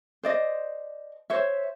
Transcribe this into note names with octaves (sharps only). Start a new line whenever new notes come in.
C5 D5 D#5
C5 C#5 E5